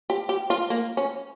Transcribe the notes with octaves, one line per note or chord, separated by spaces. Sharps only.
G4
G4
F4
A#3
C#4